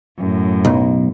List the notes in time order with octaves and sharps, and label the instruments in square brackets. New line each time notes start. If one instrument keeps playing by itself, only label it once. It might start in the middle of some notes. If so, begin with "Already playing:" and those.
[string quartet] F#2 A2
[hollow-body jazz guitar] B1